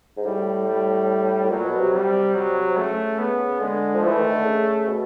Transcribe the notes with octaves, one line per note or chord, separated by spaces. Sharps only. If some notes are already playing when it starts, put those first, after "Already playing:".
G#2
A2 G3
G3
A2
A#2 F#3
B2
C3
C3 G3
F#3
C#3 A3
B3
D3 G#3
F3
E3 A3
D#3
D3
C#3
B2